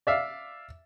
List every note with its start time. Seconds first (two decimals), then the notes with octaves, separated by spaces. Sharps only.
0.07 D5 E5 F5